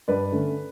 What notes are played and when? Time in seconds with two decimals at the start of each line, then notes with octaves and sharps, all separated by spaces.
0.08 G2 B4 D5
0.32 D3 A3 C#4